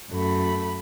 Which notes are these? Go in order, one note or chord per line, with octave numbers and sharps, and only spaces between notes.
F#2 A3 B5